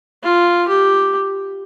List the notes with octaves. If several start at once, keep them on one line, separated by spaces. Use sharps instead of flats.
F4
G4